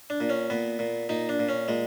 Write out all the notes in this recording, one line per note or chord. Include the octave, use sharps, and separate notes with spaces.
D4
A#2
C#4
A#2 B3
A#2
A#2 D#4
D4
A#2
C#4
A#2 G#3